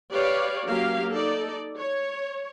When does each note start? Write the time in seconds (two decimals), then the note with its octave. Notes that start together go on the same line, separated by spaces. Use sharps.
0.12 G4 B4 C#5 D5 F5
0.67 F#3 A#3 C#4 G4 F5
1.12 D#4 A4 D5
1.77 C#5